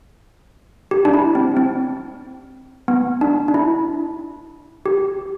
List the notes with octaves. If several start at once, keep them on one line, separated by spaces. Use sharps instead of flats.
G4
D4
E4
C4
C4
B3
D4
D4
E4
G4